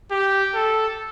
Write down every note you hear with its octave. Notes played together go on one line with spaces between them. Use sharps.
G4
A4